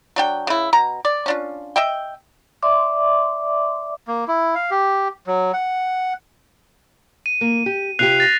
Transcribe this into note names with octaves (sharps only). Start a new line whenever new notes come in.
F#3 D4 G5
C#3 E4
B2 A#5
D5
C#4 D4 F4
D#5 E5 G5
D5 E5 C6 D6
A#3
E4
F5
G4
F#3
F#5
D#7
A#3
G4
C3 F4 G4 F#6 C7 F7
A6 A#6